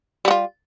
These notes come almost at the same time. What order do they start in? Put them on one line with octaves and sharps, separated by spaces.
G3 F#4 F4